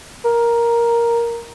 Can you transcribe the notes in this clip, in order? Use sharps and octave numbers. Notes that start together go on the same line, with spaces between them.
A#4